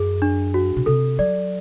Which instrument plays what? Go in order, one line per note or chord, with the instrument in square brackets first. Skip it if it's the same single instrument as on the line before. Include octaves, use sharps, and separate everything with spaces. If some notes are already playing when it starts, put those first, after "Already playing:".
Already playing: [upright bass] F#2 [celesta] G#4
[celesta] D4
F#4
[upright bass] B2
[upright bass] C3 [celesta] A4
[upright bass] F#3 [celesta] D5